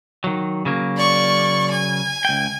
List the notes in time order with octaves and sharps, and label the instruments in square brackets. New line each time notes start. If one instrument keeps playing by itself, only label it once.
[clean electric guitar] D#3 F#3
C#3 F#3 A#3
[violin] D5 C#6
G#5
[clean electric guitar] C#2 G5